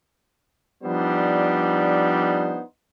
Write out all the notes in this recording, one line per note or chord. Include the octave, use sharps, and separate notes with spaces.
F3 G3 B3 D4 D#4 C5